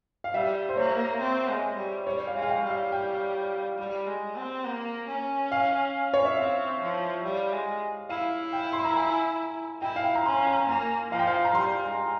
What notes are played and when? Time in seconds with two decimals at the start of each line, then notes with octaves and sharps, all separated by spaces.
0.24 F5
0.34 G3 E5
0.69 C5
0.77 A#3 C#5
1.20 C4
1.48 G#3
1.77 G3
2.06 G3 C#5
2.27 F5
2.34 G#3
2.42 F5
2.49 G5
2.64 G3
2.70 F5
2.92 G5
3.78 G3
4.07 G#3
4.36 C4
4.65 A#3
5.08 C#4
5.52 F5
6.14 C#5
6.25 E5
6.37 C4 F5
6.81 F3
7.23 G3
7.53 G#3
8.09 E4 F5
8.53 G5
8.73 C6
8.85 A#5
8.97 G#5
9.82 E4 G5
9.96 F5
10.04 G5
10.15 A#5
10.26 C#4 C6
10.47 A#5
10.68 A#3 G#5
11.11 F3 F5
11.19 G5
11.27 F5
11.45 A#5
11.54 G3 C6
11.83 G#3